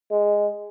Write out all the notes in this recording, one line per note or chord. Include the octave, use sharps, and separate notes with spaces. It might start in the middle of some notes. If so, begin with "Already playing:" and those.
G#3